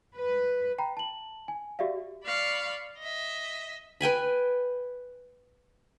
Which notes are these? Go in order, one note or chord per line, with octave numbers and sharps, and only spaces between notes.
B4
G5 A#5 B5
A5 F#7
G#5
F#4 G4 D5 E5 F5
D5 F5 B5 C#6
D#5 E5
B4 G5 G#5 B5